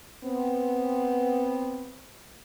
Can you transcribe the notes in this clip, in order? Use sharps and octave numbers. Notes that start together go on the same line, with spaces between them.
B3 C4